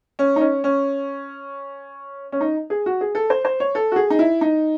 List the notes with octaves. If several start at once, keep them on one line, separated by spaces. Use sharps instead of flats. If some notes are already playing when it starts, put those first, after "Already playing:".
C#4
D#4
C#4
C#4
C#4
D#4
G#4
F#4
G#4
A4
C5
C5
C#5
A4
F#4
G#4
D#4
E4
D#4